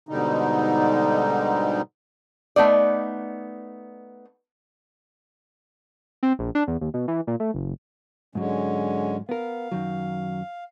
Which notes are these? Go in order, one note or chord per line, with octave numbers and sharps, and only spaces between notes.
G#2 B2 D3 G3 D#4
A3 B3 D#4 D5
C4
A#1
D4
E2
D#2
B2
E3
A#2
A3
F#1
G#2 D3 F#3 G#3 C#4
B3 A#4 F5
F#2 D#3 F#3